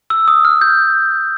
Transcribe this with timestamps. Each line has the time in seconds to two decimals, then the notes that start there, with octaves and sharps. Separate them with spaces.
0.10 E6
0.28 D#6
0.45 F6
0.61 G6